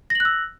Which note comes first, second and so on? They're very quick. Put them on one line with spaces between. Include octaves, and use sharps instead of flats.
A#6 F#7 F#6 E6